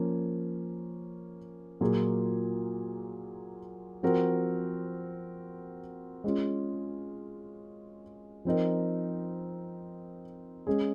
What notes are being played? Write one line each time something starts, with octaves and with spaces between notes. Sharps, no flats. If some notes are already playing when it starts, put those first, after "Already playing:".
Already playing: F3 A#3 C#4
A#2 F#3 A#3 F4 G#4
F3 C4 F#4 A#4
G#3 C#4 F4
F3 C4 D#4 A#4
G#3 C#4 G#4